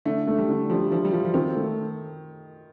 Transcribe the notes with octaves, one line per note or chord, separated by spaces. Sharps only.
D3 A3
A3
G3
D3
F3 G3
F3 F4
G3
F3 F4
F3
D#3 C4
A3